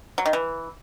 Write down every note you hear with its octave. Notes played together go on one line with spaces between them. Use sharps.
F#3
D#3
E3